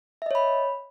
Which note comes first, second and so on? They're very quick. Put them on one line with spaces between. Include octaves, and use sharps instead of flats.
E5 D#5 C#5 B5